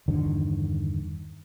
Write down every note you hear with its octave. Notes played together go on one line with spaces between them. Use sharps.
E2 G2 D3 D#3